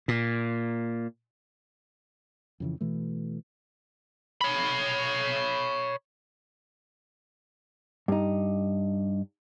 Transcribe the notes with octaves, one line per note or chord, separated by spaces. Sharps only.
A#2
F2 C#3 E3
B2 E3 A3
C#5 B5
G2 D#4